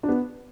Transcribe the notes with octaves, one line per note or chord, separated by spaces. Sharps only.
D4
B3